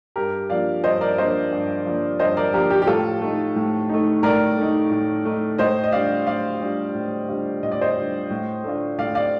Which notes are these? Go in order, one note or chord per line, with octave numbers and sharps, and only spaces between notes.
G2 G4 A#4
F3 A#3 D4 F4 D5 F5
G2 C5 D#5
A#4 D5
F3 A#3 D4 F4 C5 D#5
G2
F3 A#3 D4 F4
G2 C5 D#5
A#4 D5
F3 A#3 D4 F4 G4 A#4
G4
G4
A2 F4 A4
A3 D#4
A2
A3 D#4
A2 A#4 D5
A3 D#4
A2
A3 D#4
A2 C5 D#5
D#5
G3 D4 F4 D5 F5
A2 D5 F5
G3 D4 F4
A2
G3 D4 F4
A2 D#5
D5
C5 D#5
G3 D4 F4
A2
A3 D4 F4
A2 D5 F5
D5 F5